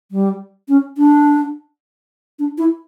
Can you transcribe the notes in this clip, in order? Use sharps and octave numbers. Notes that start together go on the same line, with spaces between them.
G3
C#4
D4
D4
E4